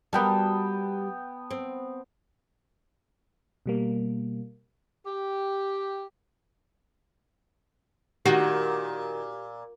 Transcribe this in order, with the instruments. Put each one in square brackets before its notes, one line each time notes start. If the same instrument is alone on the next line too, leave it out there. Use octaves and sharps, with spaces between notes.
[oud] G3 F#4 A#4 [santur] B3 G5 A5
[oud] C4
[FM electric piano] B2 G3 A#3
[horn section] G4
[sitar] A#2 [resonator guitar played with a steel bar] D#3 [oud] F#4 [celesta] G4